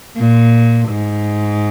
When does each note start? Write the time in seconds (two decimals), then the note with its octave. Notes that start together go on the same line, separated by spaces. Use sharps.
0.16 A#2
0.89 G#2